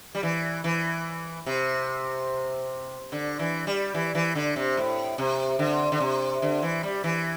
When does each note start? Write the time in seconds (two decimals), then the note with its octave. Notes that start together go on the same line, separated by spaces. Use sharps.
0.15 G3
0.23 E3
0.64 E3
1.46 C3
3.12 D3
3.39 E3
3.67 G3
3.94 E3
4.15 E3
4.35 D3
4.56 C3
4.77 A2
5.18 C3
5.59 D3
5.92 D3
6.00 C3
6.42 D3
6.62 E3
6.83 G3
7.04 E3